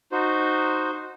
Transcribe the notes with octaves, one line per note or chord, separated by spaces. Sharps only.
D#4 F#4 C5